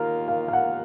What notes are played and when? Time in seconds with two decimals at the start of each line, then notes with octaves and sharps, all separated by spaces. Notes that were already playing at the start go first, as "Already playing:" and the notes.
Already playing: D#2 D#3 A#3 F4 A#4
0.28 F5
0.48 F5
0.53 F#5